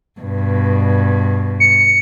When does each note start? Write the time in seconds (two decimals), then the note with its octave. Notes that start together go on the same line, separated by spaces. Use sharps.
0.20 G2 B2
1.60 C#7